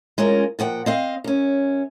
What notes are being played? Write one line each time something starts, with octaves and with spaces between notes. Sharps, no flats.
G#3 C#4 F4 A#4
A#2 F3 F#5 G5
C4 D#5 F5
F#2 C#4